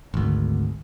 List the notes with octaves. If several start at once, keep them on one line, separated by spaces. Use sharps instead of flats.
G#1 D2